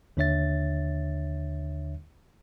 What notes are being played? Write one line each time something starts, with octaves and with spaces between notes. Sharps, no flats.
D#2 D3 D4 C#5 E5 A6